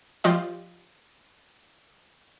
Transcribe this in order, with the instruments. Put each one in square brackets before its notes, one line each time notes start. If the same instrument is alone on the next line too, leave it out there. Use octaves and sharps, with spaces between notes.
[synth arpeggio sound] F3 F4 G4 D5 D#5